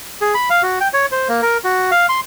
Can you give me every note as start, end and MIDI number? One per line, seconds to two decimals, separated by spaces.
0.21 0.34 68
0.34 0.49 83
0.50 0.62 77
0.63 0.79 66
0.80 0.88 79
0.93 1.06 73
1.12 1.28 72
1.29 1.41 58
1.42 1.57 70
1.64 1.91 66
1.91 2.06 77
2.09 2.20 84